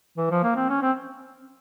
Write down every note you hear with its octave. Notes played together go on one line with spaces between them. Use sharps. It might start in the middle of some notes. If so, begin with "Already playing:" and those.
E3
F3
A#3
C4
C#4
C4